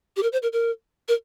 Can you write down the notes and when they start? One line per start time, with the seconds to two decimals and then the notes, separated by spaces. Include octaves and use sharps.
0.16 G4
0.23 A#4
0.32 C5
0.43 A#4
0.53 A#4
1.08 A#4